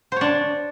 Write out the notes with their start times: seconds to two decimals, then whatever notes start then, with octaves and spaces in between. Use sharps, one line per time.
0.12 C5
0.16 C#5
0.21 D4